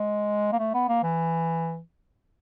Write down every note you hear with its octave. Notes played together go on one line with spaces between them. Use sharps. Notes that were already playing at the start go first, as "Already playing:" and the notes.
Already playing: G#3
A#3
A3
B3
A#3
E3